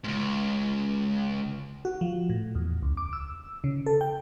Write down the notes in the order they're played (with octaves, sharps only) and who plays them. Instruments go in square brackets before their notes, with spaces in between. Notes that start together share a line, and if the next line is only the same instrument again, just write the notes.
[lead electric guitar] C#2 G#2
[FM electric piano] F#4
F3
A2
E2
C#2
D6
E6
C#3
A4
G5